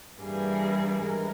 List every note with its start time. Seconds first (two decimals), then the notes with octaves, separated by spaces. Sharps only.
0.21 G2 E3 G3 A#3 G#4
1.00 G2 E3 G#3 A#4